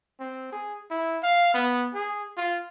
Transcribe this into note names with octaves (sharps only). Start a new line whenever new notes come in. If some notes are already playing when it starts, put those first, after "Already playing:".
C4
G#4
E4
F5
B3
G#4
F4